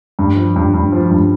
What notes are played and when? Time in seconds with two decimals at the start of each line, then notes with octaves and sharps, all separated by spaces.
0.19 G2
0.36 F3
0.56 G2
0.74 G2
0.92 F3
1.11 G2